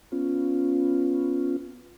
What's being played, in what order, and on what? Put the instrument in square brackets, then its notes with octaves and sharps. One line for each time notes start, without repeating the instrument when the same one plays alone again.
[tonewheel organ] B3 C#4 F4